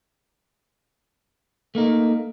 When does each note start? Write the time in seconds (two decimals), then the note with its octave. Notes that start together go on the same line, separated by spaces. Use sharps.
1.75 A3 A#3 D#4